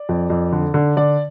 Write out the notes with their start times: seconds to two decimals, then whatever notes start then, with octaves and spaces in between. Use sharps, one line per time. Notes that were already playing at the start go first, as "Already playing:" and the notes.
Already playing: D5
0.09 F2
0.30 F2
0.52 D3
0.74 D3
0.97 D3 D5